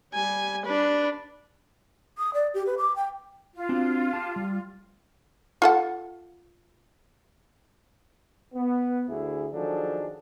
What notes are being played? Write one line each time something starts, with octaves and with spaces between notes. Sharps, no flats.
G3 G#5
D4 B4
D#6
D5
G4
B4
D6
G5
F4
C4 D4 F#4
G4 A5
G3
F4 A4 F#5
B3
D2 E4 G#4
D#3 F3 F#3 D4 G#4 A4